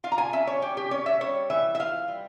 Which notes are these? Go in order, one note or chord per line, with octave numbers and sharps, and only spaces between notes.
F4 F5
A#5
G#5
C#4 E5
C#5
C#4 G4
G4
C#4 C#5
E5
G3 C#5
E3 E5
E5
F4 F5
G3